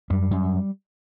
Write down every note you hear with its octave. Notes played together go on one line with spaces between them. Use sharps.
F#2 G3
F#2